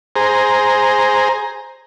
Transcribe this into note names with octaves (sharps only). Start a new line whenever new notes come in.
G#4 C5 A#5